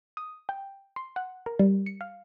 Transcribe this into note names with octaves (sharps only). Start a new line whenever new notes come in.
D#6
G5
C6
F#5
A#4
G3
C#7
F5